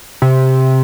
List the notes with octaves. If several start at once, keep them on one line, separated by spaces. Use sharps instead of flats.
C3